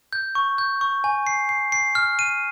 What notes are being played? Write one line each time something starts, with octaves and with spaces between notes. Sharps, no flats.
G6
C#6
G6
C#6
G#5
C7
C7
C7
F6
D#7